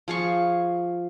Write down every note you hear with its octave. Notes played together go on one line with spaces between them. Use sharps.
F3 G#4 F5 C#6